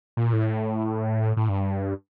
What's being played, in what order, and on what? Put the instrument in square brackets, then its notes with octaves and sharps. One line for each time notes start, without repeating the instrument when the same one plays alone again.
[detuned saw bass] A#2
A2
A2
G2